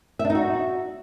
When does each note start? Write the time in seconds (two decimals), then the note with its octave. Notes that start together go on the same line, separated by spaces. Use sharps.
0.19 E5
0.25 D4
0.30 D#4
0.35 F#4